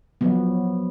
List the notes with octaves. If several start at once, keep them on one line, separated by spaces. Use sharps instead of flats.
F3 F#3 B3